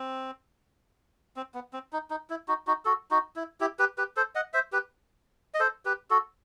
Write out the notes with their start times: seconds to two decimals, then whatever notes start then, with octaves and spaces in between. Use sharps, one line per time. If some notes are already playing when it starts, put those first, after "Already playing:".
Already playing: C4
1.36 C4
1.54 B3
1.73 C4
1.93 D#4
2.10 D#4
2.30 E4
2.48 D#4 F#4
2.67 D#4 F#4
2.85 F#4 A4
3.11 D#4 F#4
3.36 E4
3.60 E4 G4
3.79 G4 B4
3.98 G4 B4
4.16 A4 C5
4.35 D#5 F#5
4.54 C5 E5
4.72 G4 B4
5.54 D#5
5.60 A4 C5
5.85 G4 B4
6.10 F#4 A4